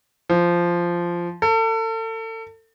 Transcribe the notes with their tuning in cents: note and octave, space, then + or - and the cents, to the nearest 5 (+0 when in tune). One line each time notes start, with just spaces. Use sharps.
F3 -10
A4 +35